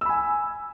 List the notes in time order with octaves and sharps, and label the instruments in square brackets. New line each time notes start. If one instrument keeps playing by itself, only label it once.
[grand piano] E6
B5
G#5